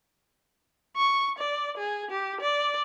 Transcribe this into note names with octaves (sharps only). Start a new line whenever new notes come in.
C#6
D5
G#4
G4
D5